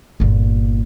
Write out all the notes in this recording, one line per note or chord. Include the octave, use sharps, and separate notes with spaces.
G1 A#2